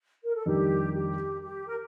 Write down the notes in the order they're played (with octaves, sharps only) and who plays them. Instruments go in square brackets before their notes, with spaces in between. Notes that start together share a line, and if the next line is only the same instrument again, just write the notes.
[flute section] A#4
A4
[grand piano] F2 D#3 G3 D4 [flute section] G4
[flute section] G4
G4
A#4